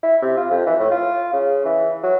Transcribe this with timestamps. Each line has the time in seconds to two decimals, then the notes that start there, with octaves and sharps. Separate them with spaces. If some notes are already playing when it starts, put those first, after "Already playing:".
0.03 E4
0.22 C3
0.37 F4
0.50 F2
0.66 E3
0.79 A2
0.91 F4
1.33 C#3
1.65 E3
2.03 F#3